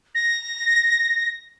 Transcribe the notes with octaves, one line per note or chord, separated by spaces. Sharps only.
A#6